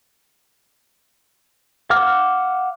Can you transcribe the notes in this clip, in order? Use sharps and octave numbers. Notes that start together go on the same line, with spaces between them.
F5 F#5 D6 F6